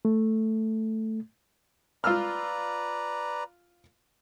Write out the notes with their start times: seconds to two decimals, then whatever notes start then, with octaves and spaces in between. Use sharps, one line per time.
0.05 A3
2.04 F4 B4 D5 A#5 E6 F6